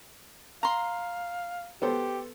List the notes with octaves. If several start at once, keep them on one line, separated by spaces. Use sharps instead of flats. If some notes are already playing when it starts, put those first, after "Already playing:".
F5 A#5 C6
B3 G4 A4 C5